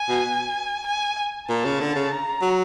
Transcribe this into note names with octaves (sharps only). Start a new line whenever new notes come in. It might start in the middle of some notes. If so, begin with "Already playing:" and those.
Already playing: G#5
B2
G#5
A#2 A5
C#3
D3
C#3
A#5
F#3